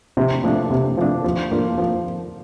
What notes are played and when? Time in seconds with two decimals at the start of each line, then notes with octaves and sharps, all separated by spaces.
0.17 C3
0.44 F3 A3 D4
0.71 C3
0.97 F3 A3 D4
1.24 F3
1.51 A#3 D4 F4
1.78 F3